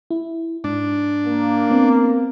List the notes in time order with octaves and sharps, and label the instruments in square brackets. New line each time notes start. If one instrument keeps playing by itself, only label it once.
[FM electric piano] E4
[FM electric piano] G#2 [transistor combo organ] D4
[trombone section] A#3
[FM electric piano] B3 C4